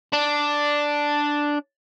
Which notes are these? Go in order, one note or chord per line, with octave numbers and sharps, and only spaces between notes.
D4